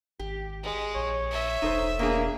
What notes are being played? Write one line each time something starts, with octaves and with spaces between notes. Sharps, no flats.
G#1 G4
G#3
A#1 C#5
E5
E1 D#4 A4 C5
B2 A#3 D4 G#4